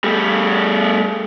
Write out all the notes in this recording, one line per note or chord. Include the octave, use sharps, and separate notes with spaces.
G3 A3